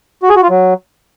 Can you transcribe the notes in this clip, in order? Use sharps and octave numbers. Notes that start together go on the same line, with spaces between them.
F#4
G#4
F#4
F4
F#3